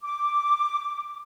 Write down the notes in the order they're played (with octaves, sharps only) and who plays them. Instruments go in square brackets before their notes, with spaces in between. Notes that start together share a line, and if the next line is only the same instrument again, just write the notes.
[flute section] D6